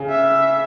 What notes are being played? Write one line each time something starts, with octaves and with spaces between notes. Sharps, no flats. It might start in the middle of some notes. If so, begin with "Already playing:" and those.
Already playing: C#3
E5